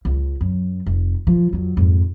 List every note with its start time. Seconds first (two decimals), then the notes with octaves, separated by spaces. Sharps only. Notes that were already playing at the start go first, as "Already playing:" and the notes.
0.05 C#2
0.41 F#2
0.86 F1
1.27 F3
1.53 F2 F#3
1.77 F2 G#2